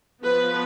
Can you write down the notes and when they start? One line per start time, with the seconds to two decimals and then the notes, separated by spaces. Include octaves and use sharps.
0.22 F3 B3 B4